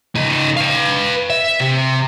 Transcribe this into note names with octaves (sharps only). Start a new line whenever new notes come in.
C#3 D#4
B4 F5
E5
C3